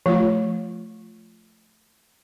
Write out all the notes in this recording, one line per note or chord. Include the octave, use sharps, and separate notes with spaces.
F3 A3 F4 C#5